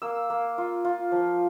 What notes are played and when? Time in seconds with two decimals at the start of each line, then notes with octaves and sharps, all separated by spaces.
0.02 A#3 E6
0.30 A#3
0.58 F4
0.85 F4
1.12 F3